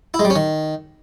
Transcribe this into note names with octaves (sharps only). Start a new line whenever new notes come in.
E4
G#3
G3
C#4
D#3